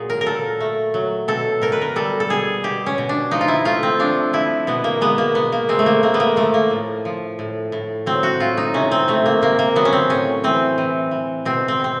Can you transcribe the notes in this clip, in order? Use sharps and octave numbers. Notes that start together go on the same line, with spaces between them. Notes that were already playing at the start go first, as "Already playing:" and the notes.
Already playing: A#2 F#3 G#4
A#4
A#4
A#2 A4
A3
F#3
B2 A4
B2 A#4
B4
A#4
G3 A4
A4
B2 G#4
B2 G4
C#4
B2
D4
F3 D#4
F4
E4
A3 F4
C4
F3 D4
F3 E4
B2 B3
A#3
G#3 B3
A#3
B2 B3
A#3
G#3 C4
A3
A#3
A3 A#3
B3
A#3
F3 A3
A#3
A2
F3
A2
A2
F#3 C4
F#4
A2 F4
D#4
C3 C#4
C4
C3 A3
A#3
C3 A#3
A#3
F#3 B3
C#4
C4
A2 C#4
E3 C4
E3
E3
B2 C4
C4
B2 C4